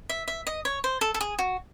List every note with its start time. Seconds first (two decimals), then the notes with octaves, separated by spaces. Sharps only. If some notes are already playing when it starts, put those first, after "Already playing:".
0.09 E5
0.28 E5
0.47 D#5
0.65 C#5
0.84 C5
1.01 A4
1.14 A4
1.21 G#4
1.39 F#4